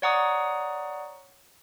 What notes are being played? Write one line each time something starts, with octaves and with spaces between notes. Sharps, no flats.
C#5 D5 F#5 A#5 C#6 D#6